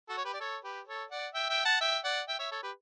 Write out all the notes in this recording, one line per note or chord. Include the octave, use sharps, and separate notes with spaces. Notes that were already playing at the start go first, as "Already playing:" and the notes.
F#4 A4
C#5
G4 B4
D5
A4 C#5
G4 B4
A4 C#5
D5 F#5
E5 G5
E5 G5
F#5 A5
E5 G5
D5 F#5
E5 G5
C#5 E5
A4 C#5
G4 B4